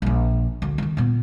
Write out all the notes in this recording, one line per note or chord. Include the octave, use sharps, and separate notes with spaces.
A#1 D4
D2
D#3 E3
A#2 B3